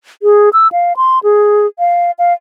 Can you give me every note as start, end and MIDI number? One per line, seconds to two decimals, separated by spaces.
0.23 0.49 68
0.53 0.68 88
0.72 0.93 77
0.97 1.19 84
1.24 1.67 68
1.79 2.11 77
2.19 2.33 77